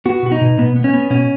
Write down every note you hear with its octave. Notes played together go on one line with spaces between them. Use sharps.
B3 F#4
B2 F#4
D#4
B2
B2 B3
B3
C#4
B3
B2 C#4